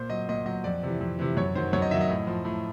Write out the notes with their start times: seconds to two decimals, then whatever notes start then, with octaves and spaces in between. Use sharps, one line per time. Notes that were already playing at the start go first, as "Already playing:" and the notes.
Already playing: A#2 C5
0.10 F#3 D#5
0.29 A#2 D#5
0.46 F#3 D#5
0.64 F2 D5
0.83 C3 E3
1.01 F2
1.19 C3 E3
1.37 F#2 C#5
1.55 D#3 F#3 C5
1.73 F#2 C#5
1.82 D#5
1.91 D#3 E5
1.95 F#3
2.01 D#5
2.10 A2
2.27 F3
2.45 A2